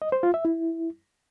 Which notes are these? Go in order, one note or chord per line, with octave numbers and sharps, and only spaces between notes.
D#5
C5
F4
E5
E4